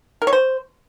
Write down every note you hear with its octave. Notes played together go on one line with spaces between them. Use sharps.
A#4
C#5
C5